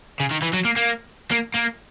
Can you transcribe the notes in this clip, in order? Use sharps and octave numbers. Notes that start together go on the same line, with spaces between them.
C#3
D#3
E3
F#3
A#3
A#3
A#3
A#3